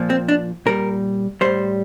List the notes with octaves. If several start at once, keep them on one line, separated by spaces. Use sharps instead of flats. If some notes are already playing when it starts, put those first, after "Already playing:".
Already playing: A#2 F3
C4
D4
A#2 G3 A#4
A2 G3 C5